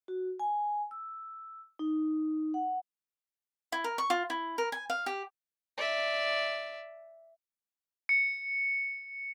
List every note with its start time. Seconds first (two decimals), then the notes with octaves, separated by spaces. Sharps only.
0.08 F#4
0.40 G#5
0.91 E6
1.79 D#4
2.54 F#5
3.72 E4
3.84 A#4
3.98 C#6
4.10 F4
4.30 E4
4.58 A#4
4.72 G#5
4.90 F5
5.06 G4
5.78 D5 E5
8.09 C#7